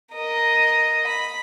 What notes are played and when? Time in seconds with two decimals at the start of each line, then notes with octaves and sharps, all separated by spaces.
0.14 A#4 D#5
1.07 B5